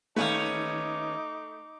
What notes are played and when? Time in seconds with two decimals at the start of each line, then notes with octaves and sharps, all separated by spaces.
0.16 D#2 A3 C#4 D#4 B4 E5 F5 D6